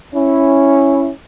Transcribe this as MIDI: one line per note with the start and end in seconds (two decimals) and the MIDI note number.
0.14 1.10 61
0.14 1.10 64